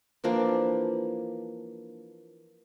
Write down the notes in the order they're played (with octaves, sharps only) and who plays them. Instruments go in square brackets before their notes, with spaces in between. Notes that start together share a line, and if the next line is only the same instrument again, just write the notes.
[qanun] E3 F3 A#3 D4